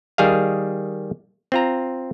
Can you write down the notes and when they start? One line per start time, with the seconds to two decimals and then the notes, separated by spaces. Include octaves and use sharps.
0.18 D#3 G3 G#4 D#5 F5
1.52 C4 F4 A#5